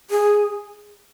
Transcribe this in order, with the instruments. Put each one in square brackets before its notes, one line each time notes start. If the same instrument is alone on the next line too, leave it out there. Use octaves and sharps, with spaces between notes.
[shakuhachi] G#4